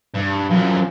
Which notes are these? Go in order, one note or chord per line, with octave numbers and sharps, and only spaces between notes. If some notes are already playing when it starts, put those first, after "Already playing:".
G2
F#2 F3